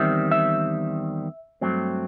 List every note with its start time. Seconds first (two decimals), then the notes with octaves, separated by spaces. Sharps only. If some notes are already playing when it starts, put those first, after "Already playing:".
Already playing: E2 D#3 G3 C4 E5
0.31 E5
1.61 G2 F#3 A3 C4